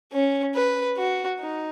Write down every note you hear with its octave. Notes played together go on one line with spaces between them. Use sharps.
C#4
B4
F#4
D#4